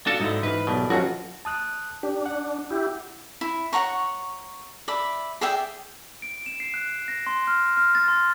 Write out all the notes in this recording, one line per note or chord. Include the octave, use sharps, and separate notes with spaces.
D4 F4 F#4 A4 A5
G#2 D3 D#4 E4
G#2 E3 B4 F5
B1 B2 G4 A#4 D5
G1 D#2 F3 F#3 C#4 F#4
A5 D#6 F#6
D4 G4
F#5
E4 G4
E4
C#5 F#5 A#5 C#6
D5 E5 B5
G#4 D5 E5 G5
D7
E7
C7
F#6
A#6
C6
F6
F6
A6
C6